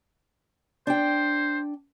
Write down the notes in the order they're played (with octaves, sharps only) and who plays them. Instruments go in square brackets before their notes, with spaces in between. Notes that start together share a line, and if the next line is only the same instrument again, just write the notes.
[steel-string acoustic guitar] D4 G5 [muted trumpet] C5